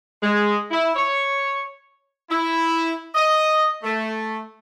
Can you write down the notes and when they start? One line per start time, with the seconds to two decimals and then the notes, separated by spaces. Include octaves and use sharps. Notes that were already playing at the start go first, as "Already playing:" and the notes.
0.22 G#3
0.71 E4
0.96 C#5
2.30 E4
3.15 D#5
3.83 A3